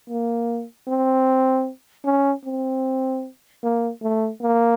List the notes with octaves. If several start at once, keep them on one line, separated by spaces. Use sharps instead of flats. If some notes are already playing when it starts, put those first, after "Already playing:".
A#3
C4
C#4
C4
A#3
A3
A#3